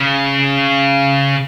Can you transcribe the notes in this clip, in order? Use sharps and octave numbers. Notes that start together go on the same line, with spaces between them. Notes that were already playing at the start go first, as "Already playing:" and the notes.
Already playing: C#3